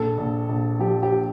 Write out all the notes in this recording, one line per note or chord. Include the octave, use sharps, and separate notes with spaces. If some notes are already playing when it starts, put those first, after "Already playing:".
Already playing: A#1 A4
A#1
A#1
F3 G4
G4